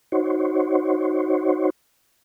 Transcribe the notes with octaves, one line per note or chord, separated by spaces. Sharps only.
D#4 F#4 C5 C#5